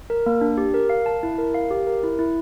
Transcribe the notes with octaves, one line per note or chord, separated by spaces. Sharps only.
A#4
A#3
D4
G4
A#4
F5
A5
E4
A#4
F5
G4
A#4
E4
E4